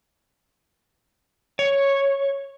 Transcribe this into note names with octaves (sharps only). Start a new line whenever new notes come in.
C#5